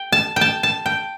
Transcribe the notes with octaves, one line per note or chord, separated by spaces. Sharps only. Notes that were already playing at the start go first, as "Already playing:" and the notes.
Already playing: G5
A5
G5
A5
A5
G5